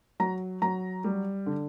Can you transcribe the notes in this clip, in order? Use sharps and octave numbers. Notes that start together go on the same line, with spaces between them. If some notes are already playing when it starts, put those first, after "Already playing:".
F#3 A#5
F#3 A#5
G3
D3